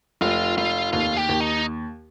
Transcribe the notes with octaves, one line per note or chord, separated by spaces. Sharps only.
F1 F4
F1 F4
D#2 F4
G4
D#2
D#4